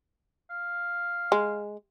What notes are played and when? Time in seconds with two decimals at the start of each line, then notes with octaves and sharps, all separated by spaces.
0.50 F5
1.32 G#3